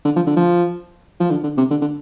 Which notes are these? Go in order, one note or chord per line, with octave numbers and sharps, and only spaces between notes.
D3
F3
D3
F3
F3
D3
D3
C3
D3
D3